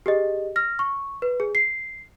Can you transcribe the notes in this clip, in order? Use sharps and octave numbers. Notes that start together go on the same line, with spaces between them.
G4 G#4 D#5
F6 A#6
C#6
B4
G#4
C7